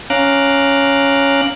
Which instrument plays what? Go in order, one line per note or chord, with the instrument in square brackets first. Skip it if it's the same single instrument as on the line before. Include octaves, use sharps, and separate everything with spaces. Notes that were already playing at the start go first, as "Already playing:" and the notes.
[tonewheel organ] C#4 F5 A#5 D6 F#6